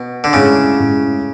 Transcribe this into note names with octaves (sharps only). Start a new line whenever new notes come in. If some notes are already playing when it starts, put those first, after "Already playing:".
Already playing: B2
D3
A2 C#3 G#3 C#4 E4
A2 G#3 C#4 E4